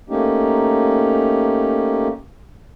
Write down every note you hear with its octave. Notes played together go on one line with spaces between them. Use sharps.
A3 A#3 C#4 D#4 G4